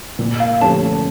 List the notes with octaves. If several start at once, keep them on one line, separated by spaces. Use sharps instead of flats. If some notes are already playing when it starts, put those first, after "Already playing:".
A#2
F5
F3 A3 C#4 G4 A5